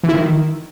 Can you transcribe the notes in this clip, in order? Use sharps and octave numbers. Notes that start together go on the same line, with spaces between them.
E3
E4
D#3